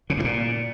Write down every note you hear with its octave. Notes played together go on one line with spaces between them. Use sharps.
C#3
G2
A#2